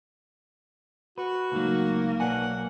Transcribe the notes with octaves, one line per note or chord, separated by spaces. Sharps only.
F#4 B4
C#2 F#3 A3 A#3 D#4
B1 F#3 B4 D5 F#5 G#5 A5